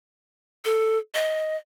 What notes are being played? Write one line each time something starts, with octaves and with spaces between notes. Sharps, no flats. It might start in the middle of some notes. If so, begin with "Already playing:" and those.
A4
D#5